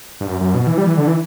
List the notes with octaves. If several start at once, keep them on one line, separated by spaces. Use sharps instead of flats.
G2
F#2
F#2
B2
E3
G3
E3
D3
E3